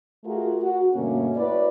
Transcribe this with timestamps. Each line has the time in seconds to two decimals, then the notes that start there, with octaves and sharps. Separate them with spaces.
0.24 A3 F4 F#4 G#4 A#4
0.60 F#4
0.94 G2 B2 D3 A3 A#3 C#4
1.36 E4 F#4 A#4 B4 C#5 D5